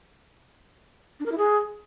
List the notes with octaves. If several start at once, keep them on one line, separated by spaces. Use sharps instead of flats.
D4
A#4
E4
G#4